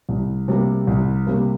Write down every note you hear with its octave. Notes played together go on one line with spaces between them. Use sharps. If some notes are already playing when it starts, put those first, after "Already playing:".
C2
C3 G3 A#3
C2
C3 G3 A#3